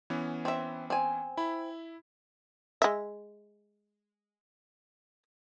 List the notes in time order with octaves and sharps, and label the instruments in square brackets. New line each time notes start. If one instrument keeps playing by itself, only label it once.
[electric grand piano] E3 B3 C#4
[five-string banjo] C4 E5
C4 G#5
[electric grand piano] E4 B5
[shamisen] G#3 E5